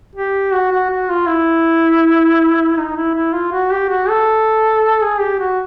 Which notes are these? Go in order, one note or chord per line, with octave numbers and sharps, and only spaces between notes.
G4
F#4
F#4
F#4
F4
E4
D#4
E4
E4
F4
F#4
G4
F#4
A4
G#4
G4
F#4